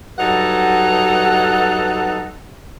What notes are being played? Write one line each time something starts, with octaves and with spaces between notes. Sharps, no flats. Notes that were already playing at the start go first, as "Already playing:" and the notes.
G2 F#3 D#4 A4 F#5